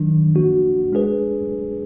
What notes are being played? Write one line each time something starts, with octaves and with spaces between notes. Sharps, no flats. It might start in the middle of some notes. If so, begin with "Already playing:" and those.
Already playing: D#3 F#3 D4
F3 A#3 D4 F#4
G#3 D4 G#4 B4